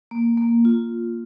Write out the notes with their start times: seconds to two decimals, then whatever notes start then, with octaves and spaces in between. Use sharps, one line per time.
0.11 A#3
0.37 A#3
0.65 F4